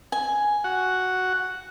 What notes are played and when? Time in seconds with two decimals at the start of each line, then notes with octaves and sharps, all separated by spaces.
0.12 G#5
0.64 F#4 F#5